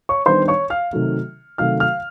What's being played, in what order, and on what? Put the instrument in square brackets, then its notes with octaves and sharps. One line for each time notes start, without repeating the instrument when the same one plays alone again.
[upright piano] C#5 C#6
D#3 G3 B3 D4 C5 C6
C#5 C#6
F5 F6
C3 D#3 F#3 A3
C3 D#3 F#3 A3 F5 F6
F5 F6